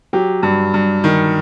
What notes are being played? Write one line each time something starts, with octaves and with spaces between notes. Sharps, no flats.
F#3 G4
G2
G2
D#3